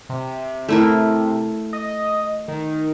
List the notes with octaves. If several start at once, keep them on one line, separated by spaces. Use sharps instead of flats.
C3
A3 E4 A#4
D#5
D#3